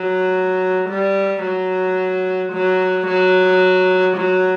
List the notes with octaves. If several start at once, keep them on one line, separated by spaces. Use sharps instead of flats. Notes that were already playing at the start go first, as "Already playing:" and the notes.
Already playing: F#3
G3
F#3
F#3
F#3
F#3